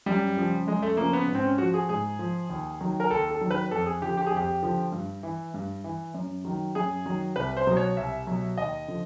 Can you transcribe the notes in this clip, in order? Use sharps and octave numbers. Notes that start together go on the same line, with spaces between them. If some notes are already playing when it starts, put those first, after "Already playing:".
F#2 G3
C#3 F3
F#2 G#3
A3
C#3 F3 A#3
B3
G#2
C4
C#4
F3 F#4
G#4
G#2 G#4
F3
D#2
D#3 F#3
A#4
D#2 A4
A4
D#3 F#3
B4
F2 A4
G#4
D3 F3 G4
G4
G#4
F2 G4
D3 F3
G2
E3
G2
E3
F#2
D#3 F#3
F#2 G#4
D#3 F#3
C2 B4
C5
B2 F#3
C#5
C2 E5
B2 F#3
D#2 D#5
D3 F3